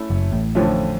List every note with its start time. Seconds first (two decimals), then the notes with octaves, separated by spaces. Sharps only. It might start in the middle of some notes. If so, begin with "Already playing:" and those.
Already playing: A3 C#4 E4
0.10 F#1 F#2
0.32 A1 A2
0.55 F2 D3 F3 A3 C#4